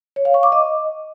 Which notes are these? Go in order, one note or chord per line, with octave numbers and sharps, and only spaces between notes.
C#5
F5
C#6
D6
D#5